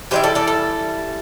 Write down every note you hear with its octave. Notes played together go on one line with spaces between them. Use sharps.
E3 G3 E4 G4 C5
A4 D5
A4 D5
A4